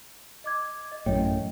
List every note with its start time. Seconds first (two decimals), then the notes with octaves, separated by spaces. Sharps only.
0.44 D#5 D6 G#6
0.92 D#5
1.06 A1 F#2 A2 C#5 D#5 G5